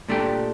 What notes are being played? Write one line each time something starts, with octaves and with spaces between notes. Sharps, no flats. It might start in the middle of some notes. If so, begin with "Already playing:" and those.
A#2 A3 D4 G4